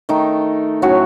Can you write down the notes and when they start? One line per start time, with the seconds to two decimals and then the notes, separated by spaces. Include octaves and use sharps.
0.09 D#3 A3 D#4
0.82 A2 F#3 C#4 F#4